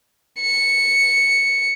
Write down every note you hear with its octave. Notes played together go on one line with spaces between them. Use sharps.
C#7